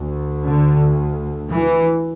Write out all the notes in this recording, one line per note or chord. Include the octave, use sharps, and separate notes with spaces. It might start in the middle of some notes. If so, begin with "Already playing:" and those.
Already playing: D2
D3
E3